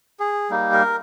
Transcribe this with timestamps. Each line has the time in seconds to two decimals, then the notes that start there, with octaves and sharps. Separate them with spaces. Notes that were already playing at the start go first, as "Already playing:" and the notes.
0.20 G#4
0.50 G3 A#3 D#4
0.72 A#4